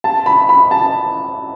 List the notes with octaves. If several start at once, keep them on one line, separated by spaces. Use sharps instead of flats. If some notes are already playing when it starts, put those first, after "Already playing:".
A5
B5
B5
A5